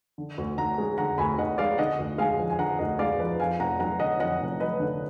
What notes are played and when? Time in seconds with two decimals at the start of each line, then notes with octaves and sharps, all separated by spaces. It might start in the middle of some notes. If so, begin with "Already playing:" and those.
0.18 D3
0.38 D2
0.58 D2 F#5 A#5
0.78 G#3
0.98 D3 F#5 A#5
1.18 D2 G#5 B5
1.38 D2 D#5 F#5
1.58 G#3 D5 F5
1.78 D3 D#5 F#5
1.99 D2
2.18 G#3 F5 G#5
2.39 F3
2.50 G#5
2.59 D3 F#5 A#5
2.79 D2 D#5 F#5
2.99 G#3 D5 F5
3.19 F3 B4
3.39 F2 F5 G#5
3.60 F1 F#5 A#5
3.79 F#3 F#5 A#5
3.99 D3 D#5 F#5
4.20 F2 D#5 F#5
4.40 F1
4.60 F#3 B4 D#5
4.80 D3